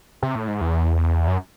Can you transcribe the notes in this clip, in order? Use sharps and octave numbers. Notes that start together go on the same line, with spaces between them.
C3
A2
G#2
E2
F#2